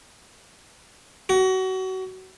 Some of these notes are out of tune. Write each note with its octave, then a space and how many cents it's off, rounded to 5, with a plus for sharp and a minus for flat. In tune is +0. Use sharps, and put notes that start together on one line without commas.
F#4 +25